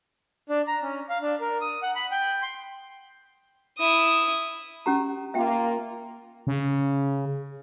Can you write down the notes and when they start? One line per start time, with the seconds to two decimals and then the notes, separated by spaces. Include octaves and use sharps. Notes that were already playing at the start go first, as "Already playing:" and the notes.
0.49 D4
0.67 A#5
0.82 C#4
1.09 F5
1.22 D4
1.40 A#4
1.61 D#6
1.83 F#5
1.96 B5
2.11 G5
2.42 C6
3.78 E4 D#6
4.86 C#4 G4 A#5
5.34 A#3 F4 E5 G5
6.47 C#3